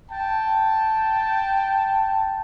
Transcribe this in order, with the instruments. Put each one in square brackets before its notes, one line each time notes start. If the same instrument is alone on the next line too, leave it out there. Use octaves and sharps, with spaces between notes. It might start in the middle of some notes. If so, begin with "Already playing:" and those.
[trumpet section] G5 A5